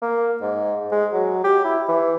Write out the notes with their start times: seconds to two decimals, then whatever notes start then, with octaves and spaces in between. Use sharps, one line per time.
0.02 A#3
0.42 G#2
0.92 G#3
1.13 F#3
1.44 G4
1.65 E4
1.88 E3